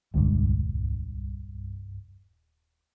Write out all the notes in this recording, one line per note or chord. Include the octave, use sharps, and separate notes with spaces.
D#1 C2 G2 D3 G#3